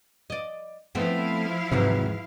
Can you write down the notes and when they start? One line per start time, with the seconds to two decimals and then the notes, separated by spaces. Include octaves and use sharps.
0.30 D5 D#5
0.95 F3 A3 B3 C4 E4 F5
1.72 D#2 G#2 C3 E3 F#3